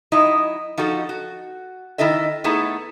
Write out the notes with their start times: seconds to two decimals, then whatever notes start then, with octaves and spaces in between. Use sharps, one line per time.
0.12 F#3 D#4 E4 D#5
0.78 F3 D#4 F#4 A4
1.09 F#4
1.98 D#3 E4 A4 D#5 E5
2.44 A3 B3 D#4 E4 G#4 A4